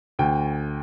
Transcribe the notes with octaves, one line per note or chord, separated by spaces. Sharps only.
D2 G5